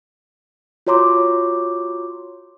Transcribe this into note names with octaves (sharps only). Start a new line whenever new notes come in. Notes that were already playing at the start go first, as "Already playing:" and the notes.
F4 F#4 C#5 A#5 C6 D6